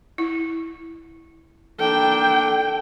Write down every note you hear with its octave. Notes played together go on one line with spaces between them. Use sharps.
E4
A#3 D4 A4 G5